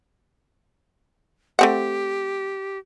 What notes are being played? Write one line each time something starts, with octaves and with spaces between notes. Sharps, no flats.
A3 C4 G4 F#5